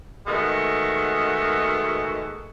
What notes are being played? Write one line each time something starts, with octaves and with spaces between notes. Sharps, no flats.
B2 D#3 G#3 A3 F#4